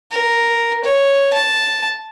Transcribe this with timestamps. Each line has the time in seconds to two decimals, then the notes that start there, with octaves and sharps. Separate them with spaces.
0.11 A#4
0.84 C#5
1.33 A5